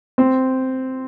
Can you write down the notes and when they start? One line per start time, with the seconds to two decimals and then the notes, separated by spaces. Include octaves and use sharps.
0.18 C4